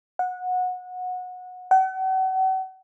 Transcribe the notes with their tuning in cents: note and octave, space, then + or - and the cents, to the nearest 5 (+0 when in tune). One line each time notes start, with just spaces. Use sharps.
F#5 -20
F#5 +40